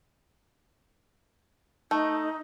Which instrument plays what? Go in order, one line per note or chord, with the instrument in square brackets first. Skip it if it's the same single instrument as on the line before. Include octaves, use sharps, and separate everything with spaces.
[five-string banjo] A3 [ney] D#4